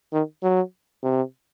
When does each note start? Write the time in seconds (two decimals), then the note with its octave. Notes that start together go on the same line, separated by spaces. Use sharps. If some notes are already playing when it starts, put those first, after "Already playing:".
0.13 D#3
0.43 F#3
1.03 C3